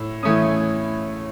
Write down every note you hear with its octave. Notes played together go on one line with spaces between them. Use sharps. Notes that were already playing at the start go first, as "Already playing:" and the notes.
Already playing: A2 E6
E3 A3 C#4 D#6